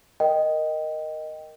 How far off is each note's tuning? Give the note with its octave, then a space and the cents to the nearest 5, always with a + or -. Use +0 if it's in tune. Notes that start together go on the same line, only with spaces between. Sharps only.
A#4 +0 D#5 +0 G5 -5